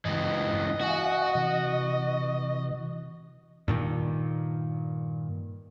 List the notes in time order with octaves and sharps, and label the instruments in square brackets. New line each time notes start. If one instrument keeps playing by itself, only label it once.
[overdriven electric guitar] C#2 E3 [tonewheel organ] G2 [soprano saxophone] D#5
[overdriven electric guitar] F#4 [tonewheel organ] E5 F5 G#5
[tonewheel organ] C3 E3
[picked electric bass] G2 A#2 D#3